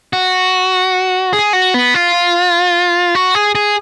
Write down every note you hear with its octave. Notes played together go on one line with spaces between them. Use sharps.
F#4
G#4
F#4
B3
F4
F#4
G#4
G#4